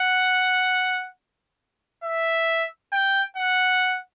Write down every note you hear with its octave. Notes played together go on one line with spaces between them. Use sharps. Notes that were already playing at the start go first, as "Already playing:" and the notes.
Already playing: F#5
E5
G5
F#5